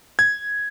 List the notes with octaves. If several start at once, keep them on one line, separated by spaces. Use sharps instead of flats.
G#6